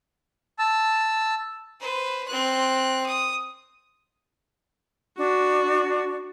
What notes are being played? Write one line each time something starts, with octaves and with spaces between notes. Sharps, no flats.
A5 E6
B4 C5
C4 F#6
D#6
D4 F#4